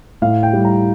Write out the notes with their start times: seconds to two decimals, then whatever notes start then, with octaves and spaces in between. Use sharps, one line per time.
0.22 A2 F5
0.43 G5
0.53 G3
0.65 A#5